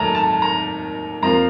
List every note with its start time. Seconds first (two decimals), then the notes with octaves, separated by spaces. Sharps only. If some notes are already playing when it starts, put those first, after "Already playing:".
Already playing: D#2 D#3 F#3 A3 A5 A#5
0.15 A5
0.42 A#5
1.22 F2 C3 F3 A#3 A#5